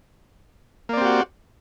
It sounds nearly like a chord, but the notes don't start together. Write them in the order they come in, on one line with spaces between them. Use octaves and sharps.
A#3 D5 C4 G4 F#4